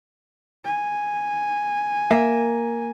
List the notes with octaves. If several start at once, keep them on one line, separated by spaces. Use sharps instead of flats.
G#5
A#3 A#4 E5